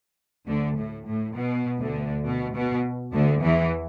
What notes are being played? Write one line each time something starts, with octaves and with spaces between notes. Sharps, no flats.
D2 D3
A2
A2
B2
D2 D3
B2
B2
D2 D3
E2 E3